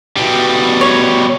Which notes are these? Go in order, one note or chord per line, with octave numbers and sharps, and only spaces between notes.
B2 G3
C#5